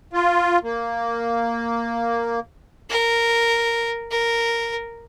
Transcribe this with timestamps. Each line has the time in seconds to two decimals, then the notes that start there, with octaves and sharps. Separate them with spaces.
0.13 F4
0.64 A#3
2.90 A#4
4.11 A#4